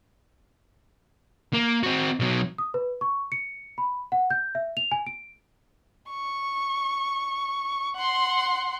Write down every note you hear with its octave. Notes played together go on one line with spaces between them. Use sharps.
A#3
C4 F#4
B2 F#3
D#6
B4
C#6
C#7
B5
F#5
G6
E5
F7
G#5
D7
C#6
F#5 C6